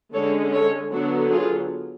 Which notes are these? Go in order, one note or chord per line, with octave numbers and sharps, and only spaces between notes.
D3 G#3 C#4 A4 C#5
A4 C#5
D3 F#3 B3 D4 F#4
F4 G#4